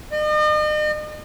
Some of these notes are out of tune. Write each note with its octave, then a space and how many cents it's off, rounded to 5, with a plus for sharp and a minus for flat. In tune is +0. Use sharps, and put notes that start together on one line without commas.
D#5 -40